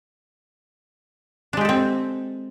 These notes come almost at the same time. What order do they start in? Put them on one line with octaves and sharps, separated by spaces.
D4 G#3 G4 A4 C4